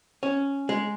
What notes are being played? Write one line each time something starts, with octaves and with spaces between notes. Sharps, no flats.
C#4
G#3